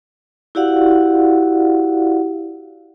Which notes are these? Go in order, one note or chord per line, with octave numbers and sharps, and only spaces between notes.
E4 F#4 G4 D5 F5 F#5